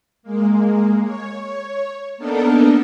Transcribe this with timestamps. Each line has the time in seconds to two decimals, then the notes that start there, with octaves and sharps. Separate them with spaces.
0.23 G#3 A#3
1.03 C#5
2.17 A#3 B3 D4 D#4 A4 A#4